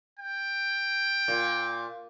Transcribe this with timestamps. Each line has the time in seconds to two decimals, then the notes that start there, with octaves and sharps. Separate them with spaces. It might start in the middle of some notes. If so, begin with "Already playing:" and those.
0.19 G5
1.28 A#2